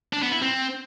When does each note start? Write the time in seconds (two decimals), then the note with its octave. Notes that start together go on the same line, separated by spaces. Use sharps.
0.13 D4
0.22 B3
0.32 E4
0.42 C4